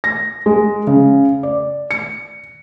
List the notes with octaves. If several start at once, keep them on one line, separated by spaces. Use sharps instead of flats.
A#6
G#3
C#3
D5
C#7